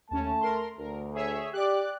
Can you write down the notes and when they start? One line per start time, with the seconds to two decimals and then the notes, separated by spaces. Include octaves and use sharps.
0.11 D#2 A3 C#4 A5
0.41 A#4 C6
0.79 D2 A#4
1.14 G#4 C#5 E5
1.53 G4 D5 D6 F#6